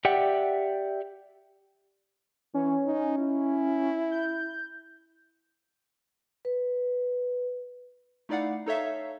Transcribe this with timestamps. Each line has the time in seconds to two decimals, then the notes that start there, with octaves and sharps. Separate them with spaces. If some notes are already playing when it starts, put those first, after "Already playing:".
0.05 G4 D5 E5 F#5 G5
2.54 E3 C#4
2.86 D#4
3.19 E4
4.11 G6
6.45 B4
8.29 A3 D#4 E4 D5 F5 F#5
8.66 D#4 A4 C#5 E5 F5